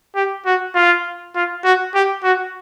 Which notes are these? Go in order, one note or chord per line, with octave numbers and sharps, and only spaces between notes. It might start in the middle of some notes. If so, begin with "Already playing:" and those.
G4
F#4
F4
F4
F#4
G4
F#4